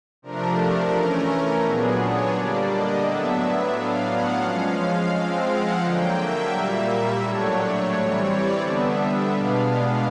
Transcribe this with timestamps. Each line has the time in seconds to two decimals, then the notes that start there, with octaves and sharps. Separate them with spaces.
0.22 C3 F3 A3 D4 A#4
0.92 E3 A3 C#4
1.62 A#2 F#3 B3 D4 G#4
1.97 C#5
2.32 D3 G3 A#3 D4 D5
2.68 D#5
3.02 A2 F#3 B3 D4 E5
3.72 A2 F#3 B3 D4 F5
4.07 F#5
4.41 F3 G#3 C#4 F5
4.76 F5
5.12 F3 G#3 C4
5.46 F#5
5.81 D3 F#3 A#3 G5
6.17 E5
6.51 A#2 G3 A#3
7.21 A2 F#3 A3 D4 C#5
7.56 C#5
7.90 E3 G3 C4 C#5
8.25 D5
8.60 D3 G3 B3 D4 E5
9.31 B2 G#3 B3 D4 F5